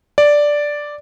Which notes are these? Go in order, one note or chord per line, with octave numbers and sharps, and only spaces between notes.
D5